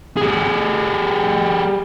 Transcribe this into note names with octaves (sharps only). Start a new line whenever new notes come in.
G3 G#4